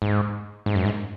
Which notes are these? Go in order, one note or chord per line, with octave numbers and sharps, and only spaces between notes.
G#2
G#2
F#2
G#2